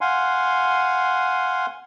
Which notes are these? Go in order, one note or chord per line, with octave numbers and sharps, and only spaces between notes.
F5 F#5 G#5 C6